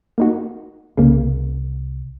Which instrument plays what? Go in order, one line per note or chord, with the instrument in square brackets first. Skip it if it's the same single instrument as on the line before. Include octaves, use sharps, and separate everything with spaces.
[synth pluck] A#3 D#4 F#4
[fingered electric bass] C2 [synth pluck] C#3 A#3